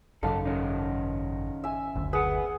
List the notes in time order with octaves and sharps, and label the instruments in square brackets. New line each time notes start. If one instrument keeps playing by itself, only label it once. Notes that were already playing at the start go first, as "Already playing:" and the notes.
[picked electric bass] G#1 F#2 C#3 [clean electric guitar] D#4 A4 [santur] F5 D6
[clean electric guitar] D#3 C#4 D#4
[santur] E5 G#5
[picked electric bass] F#1 D2
[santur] G#4 [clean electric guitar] B4 F#5